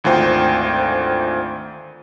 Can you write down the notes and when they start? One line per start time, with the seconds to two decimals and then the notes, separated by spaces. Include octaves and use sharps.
0.04 G#1 D2 F4 C5 G5